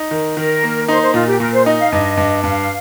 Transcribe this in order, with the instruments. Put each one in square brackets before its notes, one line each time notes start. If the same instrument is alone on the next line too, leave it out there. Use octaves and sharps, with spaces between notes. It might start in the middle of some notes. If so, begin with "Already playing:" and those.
Already playing: [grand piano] D#4
D#3
[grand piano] D#3 [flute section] A#4
[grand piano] A#3
[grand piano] D#4 [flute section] C5
[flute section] C5
[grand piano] A#2 [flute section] F4
[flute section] G4
[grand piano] A#2 [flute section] A#4
[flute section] C5
[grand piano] D#4 [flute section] D#5
[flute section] F5
[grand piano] G2 [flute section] D#5
[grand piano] G2
[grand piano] G2 [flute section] F5